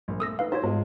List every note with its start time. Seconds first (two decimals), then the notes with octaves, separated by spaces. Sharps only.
0.08 A#1
0.20 A3 D#6 E6 A#6
0.39 D#4 B4 F5
0.52 D#4 F#4 C5 C#5
0.64 G#2 G#3 F4